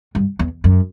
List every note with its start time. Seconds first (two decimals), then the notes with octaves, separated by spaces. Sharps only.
0.15 G2
0.39 E2
0.64 F#2